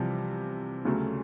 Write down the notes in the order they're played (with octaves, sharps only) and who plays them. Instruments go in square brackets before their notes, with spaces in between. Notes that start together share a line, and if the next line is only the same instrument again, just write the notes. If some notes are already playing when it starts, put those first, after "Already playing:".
Already playing: [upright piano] C2 C3 E3 [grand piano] F3 G3
[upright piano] D2 C#3 F#3 A3